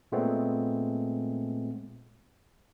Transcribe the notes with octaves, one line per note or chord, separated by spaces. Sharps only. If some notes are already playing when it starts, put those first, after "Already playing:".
A#2 G#3 A3 B3 C4